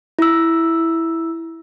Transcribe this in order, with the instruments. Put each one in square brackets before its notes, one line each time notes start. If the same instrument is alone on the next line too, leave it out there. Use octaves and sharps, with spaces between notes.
[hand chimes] E4 E6